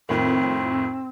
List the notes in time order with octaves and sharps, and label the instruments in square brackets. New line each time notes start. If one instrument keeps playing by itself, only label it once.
[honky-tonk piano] F2 A2 D#3 [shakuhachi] C4